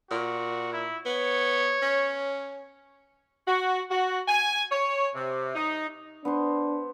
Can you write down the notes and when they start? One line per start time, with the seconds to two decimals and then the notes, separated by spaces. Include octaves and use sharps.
0.11 A#2 F#4
0.73 E4
1.05 B3 C#5
1.82 C#4
3.47 F#4
3.90 F#4
4.28 G#5
4.71 C#5
5.15 C3
5.54 D#4
6.25 B3 D4 C5